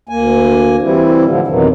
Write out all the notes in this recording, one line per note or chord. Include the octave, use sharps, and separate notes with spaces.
D2 A#3 G#5
E3 G3 C4 E4
A2 D3 F3
F2 B2 D#3 E3 F#3